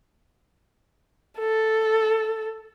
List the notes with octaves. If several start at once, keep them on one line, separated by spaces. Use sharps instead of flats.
A4